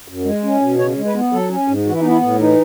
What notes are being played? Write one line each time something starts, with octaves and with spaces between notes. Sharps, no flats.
F#2
G#3
C#4
B2
C#3 C#5
G#3
B4
B3
F#3 A4
C#4
G#2
E3 F#4
E4
D#4
B3 E4
A2
E3 D#4